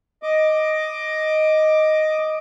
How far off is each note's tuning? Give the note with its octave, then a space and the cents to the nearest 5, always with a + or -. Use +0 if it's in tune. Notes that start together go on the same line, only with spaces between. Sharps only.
D#5 +0 D6 +10